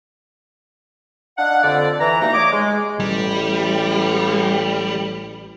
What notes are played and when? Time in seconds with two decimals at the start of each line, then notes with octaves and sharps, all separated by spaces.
1.38 D4 D#4 F5 F#5
1.63 F2 D3 D5
2.00 E3 A#5
2.21 B2 G3 A3 A#3 D#4 A#5
2.34 C#5 D#5 D6
2.52 G#3
3.00 A1 G3